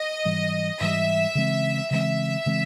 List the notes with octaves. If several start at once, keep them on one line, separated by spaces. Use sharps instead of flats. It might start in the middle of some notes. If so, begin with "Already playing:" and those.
Already playing: D#5
G#2 E3 G3
G#2 E3 G3 E5
C#3 E3 G#3 C4
C#3 E3 G#3 C4 E5
C#3 E3 G#3 C4